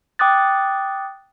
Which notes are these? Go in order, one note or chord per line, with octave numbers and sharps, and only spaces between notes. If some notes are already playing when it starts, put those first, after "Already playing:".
G5 D6 D#6 F#6 A6